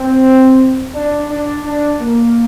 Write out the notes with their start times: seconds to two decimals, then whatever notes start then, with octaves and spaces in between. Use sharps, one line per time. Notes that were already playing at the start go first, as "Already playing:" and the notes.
Already playing: C4
0.94 D4
1.29 D4
1.65 D4
2.01 A#3